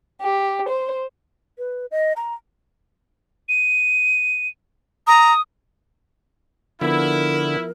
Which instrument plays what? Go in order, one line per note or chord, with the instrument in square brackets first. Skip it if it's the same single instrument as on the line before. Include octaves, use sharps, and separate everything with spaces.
[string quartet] G4
C5
[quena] B4
D#5
A#5
[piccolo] D#7
[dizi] A#5 [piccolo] D#6
[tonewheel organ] D3 [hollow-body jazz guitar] F3 B3 [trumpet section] E4 [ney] A#4